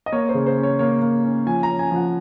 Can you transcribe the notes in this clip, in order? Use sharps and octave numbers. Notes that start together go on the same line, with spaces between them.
D#5
A#3 C#5
C5
C#3
C5
C#4
C#5
A#3 C#5
A#3
C#4
F3 G#5
A#5
C#4
G#5
F3 F#5